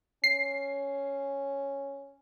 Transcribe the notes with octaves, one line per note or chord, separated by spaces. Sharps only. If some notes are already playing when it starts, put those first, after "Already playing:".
C#4 C7